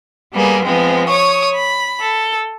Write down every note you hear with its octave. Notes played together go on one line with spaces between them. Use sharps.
G3 A#3 B3 G#4
F3 G#3 B3 C4
C#5 C#6 D#6
B5
A4